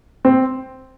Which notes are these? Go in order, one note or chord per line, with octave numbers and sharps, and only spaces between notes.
C4